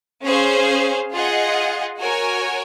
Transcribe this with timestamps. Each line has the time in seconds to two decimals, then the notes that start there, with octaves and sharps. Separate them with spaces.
0.24 C#4 G#4 C5 F5
1.12 F4 G#4 D#5 F#5
2.00 F#4 A#4 C#5 G#5